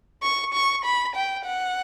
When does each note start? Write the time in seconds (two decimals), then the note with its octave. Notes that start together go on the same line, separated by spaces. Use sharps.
0.23 C#6
0.54 C#6
0.85 B5
1.15 G5
1.46 F#5